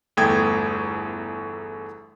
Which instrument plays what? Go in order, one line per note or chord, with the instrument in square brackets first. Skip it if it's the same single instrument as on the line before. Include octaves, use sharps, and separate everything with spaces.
[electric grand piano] G1 E2 A3 G5 D#6 G#6